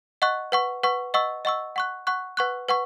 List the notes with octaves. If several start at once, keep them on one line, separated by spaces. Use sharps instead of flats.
D#5 F#5 C#6 F#6
B4 F#5 C#6
B4 F#5 C#6
D#5 F#5 C#6 E6
D#5 F#5 C#6 E6
F#5 C#6 F#6
F#5 C#6 F#6
B4 F#5 C#6 F#6
B4 F#5 C#6